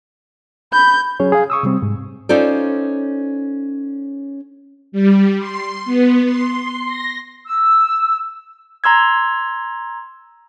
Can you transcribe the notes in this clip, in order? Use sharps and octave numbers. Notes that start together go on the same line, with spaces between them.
B5 G6
F#3 C#4 G#4 C#5
G#4 F5
C#6 D#6 E6
C3 G3 C4
G#2
C#4 D#4 F4 A4 C5 D5
G3
C6
B3
C6
A#6
E6
A#5 C6 E6 G#6